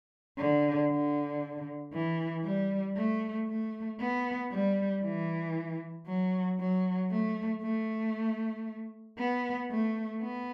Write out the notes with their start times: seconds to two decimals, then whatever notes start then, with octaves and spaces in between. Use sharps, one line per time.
0.38 D3
0.90 D3
1.93 E3
2.44 G3
2.97 A3
3.49 A3
4.00 B3
4.52 G3
5.04 E3
6.07 F#3
6.60 F#3
7.11 A3
7.63 A3
9.19 B3
9.71 A3
10.22 B3